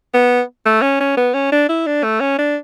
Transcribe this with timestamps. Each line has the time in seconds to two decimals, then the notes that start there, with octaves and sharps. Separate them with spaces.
0.14 B3
0.66 A3
0.82 C#4
1.00 C#4
1.17 B3
1.34 C#4
1.52 D4
1.69 E4
1.87 D4
2.04 A3
2.21 C#4
2.39 D4